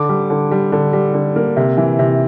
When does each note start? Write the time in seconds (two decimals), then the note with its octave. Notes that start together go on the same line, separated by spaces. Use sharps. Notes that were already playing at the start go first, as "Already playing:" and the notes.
Already playing: D3 D6
0.09 G3
0.30 D3
0.51 G3
0.72 D3
0.93 G3
1.14 D3
1.36 A#3
1.57 C3
1.77 E3
1.99 C3